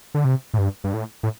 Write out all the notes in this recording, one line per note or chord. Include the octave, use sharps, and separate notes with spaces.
D3
C3
A2
G2
G2
A2
A2